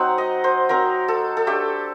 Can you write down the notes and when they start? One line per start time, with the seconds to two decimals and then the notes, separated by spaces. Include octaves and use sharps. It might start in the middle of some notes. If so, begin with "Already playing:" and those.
Already playing: F#3 C4 D#4 F#5
0.18 D#5
0.44 C5
0.69 F#3 C4 D#4 A#4
1.08 A4
1.37 A4
1.47 A3 D4 G4